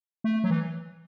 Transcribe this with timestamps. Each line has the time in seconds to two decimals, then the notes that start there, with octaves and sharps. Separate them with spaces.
0.24 A3
0.44 F#3
0.50 E3